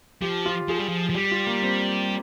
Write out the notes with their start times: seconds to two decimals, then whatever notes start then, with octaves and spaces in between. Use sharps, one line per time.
0.21 F3 G4
0.46 F4
0.69 F3 G#4
0.79 G3
0.89 F3
1.10 F3
1.15 G3 G4
1.31 F4
1.47 A#3
1.62 C4